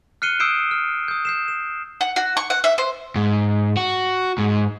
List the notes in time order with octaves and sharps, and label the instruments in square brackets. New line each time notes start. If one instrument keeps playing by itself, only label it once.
[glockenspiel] F6 F#6 C7 C#7 D#7 G7
D#6 E6 G6 C7 D7 E7
F6
D#6 G6
G6 C7 E7
E7
[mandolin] F#5
F#4
C#6
F#5
E5
C5
[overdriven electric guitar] G#2
F#4
G#2